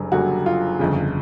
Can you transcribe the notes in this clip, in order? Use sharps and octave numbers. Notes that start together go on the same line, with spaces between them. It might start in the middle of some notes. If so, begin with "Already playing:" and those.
Already playing: F#1 F#2 D3 G3
F#1 F#2 D3 G3 F#4
F4
G1 F2 C#3